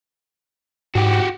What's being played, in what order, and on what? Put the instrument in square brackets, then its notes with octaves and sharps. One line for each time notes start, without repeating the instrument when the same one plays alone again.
[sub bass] G#2 [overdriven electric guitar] F#4 G4